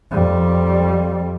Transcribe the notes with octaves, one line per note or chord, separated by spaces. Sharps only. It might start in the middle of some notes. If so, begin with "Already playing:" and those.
F2 G3